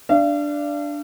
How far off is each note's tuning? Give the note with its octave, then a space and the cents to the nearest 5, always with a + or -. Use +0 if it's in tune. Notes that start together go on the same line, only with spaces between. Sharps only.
D4 +0 F5 -40